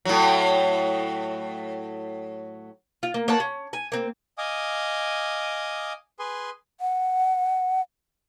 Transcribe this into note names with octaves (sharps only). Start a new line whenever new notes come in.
A2 F#3
F4
A#3
A#3 C#5 F#5 A5
C#4
G#5
A#3 C4
D#5 F5 G#5 D6 D#6
G#4 B4 G#5 C6
F#5